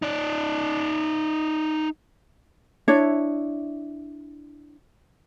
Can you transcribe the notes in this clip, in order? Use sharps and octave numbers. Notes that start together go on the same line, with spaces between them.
D#4 D5
D4 E4 C#5 E5